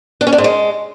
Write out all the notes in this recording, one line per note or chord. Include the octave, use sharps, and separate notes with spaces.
D4
C#4
D4
G#2
G#3